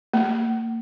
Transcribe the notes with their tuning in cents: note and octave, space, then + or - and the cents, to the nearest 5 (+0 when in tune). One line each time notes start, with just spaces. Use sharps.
A#3 -30